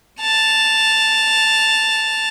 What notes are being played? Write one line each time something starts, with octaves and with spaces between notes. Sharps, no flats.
A5 F7